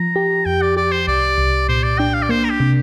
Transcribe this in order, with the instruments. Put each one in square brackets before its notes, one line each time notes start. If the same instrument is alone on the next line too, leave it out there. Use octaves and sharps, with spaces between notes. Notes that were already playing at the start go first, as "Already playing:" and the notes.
Already playing: [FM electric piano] F3 [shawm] A#5
[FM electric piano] G4
[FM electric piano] F2 [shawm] G5
[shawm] D5
[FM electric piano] G4 [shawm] D5
[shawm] C5
[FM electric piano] C2 [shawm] D5
[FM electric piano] C2
[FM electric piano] A#2 [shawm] C5
[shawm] D5
[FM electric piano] D4 [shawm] G5
[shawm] F5
D5
[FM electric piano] A#3 [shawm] C5
[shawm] A#4
G4
[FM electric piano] C3